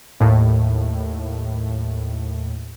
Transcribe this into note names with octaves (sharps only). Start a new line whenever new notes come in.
D#2 A2